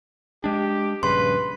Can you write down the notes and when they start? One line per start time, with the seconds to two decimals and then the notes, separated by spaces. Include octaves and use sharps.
0.44 G#3 D4 G4
1.03 A#1 G2 C#3 B4 C6